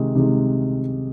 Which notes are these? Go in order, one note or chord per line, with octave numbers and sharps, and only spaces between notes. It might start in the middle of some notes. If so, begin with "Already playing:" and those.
Already playing: C3 D#3 G#3
C3 D#3 G#3